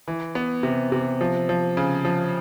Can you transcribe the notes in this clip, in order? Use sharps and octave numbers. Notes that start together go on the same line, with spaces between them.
E3
B3
C3
C3
F3
F3
C#3
F3